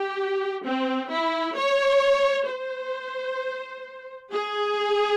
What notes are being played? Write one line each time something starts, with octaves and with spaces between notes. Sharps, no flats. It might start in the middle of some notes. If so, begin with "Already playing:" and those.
Already playing: G4
C4
E4
C#5
C5
G#4